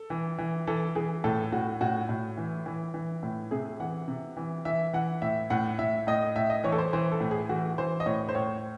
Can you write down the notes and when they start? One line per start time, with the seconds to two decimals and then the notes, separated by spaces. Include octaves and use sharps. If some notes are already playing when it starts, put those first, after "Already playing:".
Already playing: A4
0.10 E3
0.39 E3
0.67 E3 A4
0.95 E3 G#4
1.24 A2 A4
1.52 A2 F#4
1.81 A2 F#4
2.09 A2
2.38 E3
2.66 E3
2.94 E3
3.23 A2
3.51 C3 G#4
3.80 E3 F#5
4.08 C3
4.37 E3
4.65 E3 E5
4.93 E3 F#5
5.22 A2 E5
5.50 A2 F#5
5.79 A2 E5
6.07 A2 D#5
6.36 A2 E5
6.50 D#5
6.64 E3 C#5
6.72 A4
6.78 C5
6.93 E3 C5
7.12 A4
7.20 A2
7.31 G#4
7.49 E3 F#4
7.78 E3 C5
8.00 D#5
8.06 A2 C#5
8.29 C5
8.35 A2 C#5